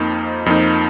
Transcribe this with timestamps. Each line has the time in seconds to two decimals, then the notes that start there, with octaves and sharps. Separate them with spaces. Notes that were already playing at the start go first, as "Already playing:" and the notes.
Already playing: F2 F3 A#3 D#4
0.46 F2 F3 A#3 D#4